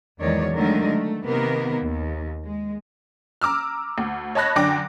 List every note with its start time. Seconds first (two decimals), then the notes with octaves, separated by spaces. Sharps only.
0.20 E2 G#2 D#3 F#3 C#5 D5
0.54 D3 D#3 F#3 G#3 A3 A#4
0.88 A3
1.25 C3 D#3 A#3 B3 A#4
1.82 D#2
2.45 G#3
3.41 A#5 D6 E6 F6
3.98 D2
4.35 C#5 D#5 A5 B5 F#6 A#6
4.56 F#2 D3 D4 G5 D6 A#6